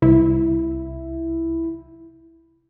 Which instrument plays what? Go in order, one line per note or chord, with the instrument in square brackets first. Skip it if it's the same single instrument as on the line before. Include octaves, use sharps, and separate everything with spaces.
[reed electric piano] C2 [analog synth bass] E4